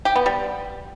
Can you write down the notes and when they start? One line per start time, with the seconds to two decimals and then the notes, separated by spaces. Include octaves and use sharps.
0.05 G4
0.16 B3
0.26 G3